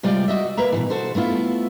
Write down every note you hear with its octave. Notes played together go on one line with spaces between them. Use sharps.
C3 G3 G#3 F4 D5 G5
F#4 D#5 E5
A#3 B4 E5 A#5
B2 D#3 E3
F#4 A4 C5
A3 B3 E4 F4